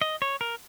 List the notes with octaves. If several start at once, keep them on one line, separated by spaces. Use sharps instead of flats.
D#5
C#5
A#4